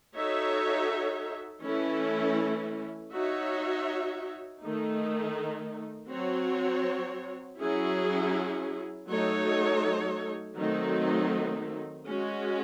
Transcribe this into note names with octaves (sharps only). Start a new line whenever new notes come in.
D#4 F#4 A4 C#5 E5
E3 A3 C#4 E4 A4
D#4 F#4 C#5 E5
D#3 A3 D#4
F#3 C4 F#4 C#5
F#3 C#4 E4 G#4
F#3 A3 D#4 A4 C#5
D#3 F#3 A3 C4 D#4
G#3 C#4 F#4